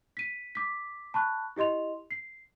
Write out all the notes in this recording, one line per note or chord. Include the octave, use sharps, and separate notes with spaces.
B6 D#7
D6 B6
A5 B5 C#6 F#6
E4 G4 D#5 C6 F7
C7